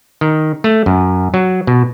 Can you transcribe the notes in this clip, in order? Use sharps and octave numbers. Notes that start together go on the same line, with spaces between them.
D#3
A3
F#2
F#3
B2